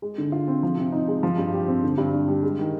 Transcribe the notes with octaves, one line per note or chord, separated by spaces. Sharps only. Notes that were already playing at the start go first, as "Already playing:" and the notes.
G#3
D3
F4
C4
F3
C3
D#4
G#3
F3
G2
G4
C4
D3
G2
D4
G3
G#3
D#3